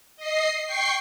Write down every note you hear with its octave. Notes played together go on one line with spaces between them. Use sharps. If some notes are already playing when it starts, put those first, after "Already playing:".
D#5 C7
G5 C#6 C7